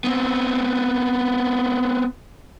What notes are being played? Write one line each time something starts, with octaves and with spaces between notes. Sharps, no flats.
B3 C4